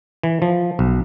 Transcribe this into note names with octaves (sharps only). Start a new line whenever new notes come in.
E3
F3
B1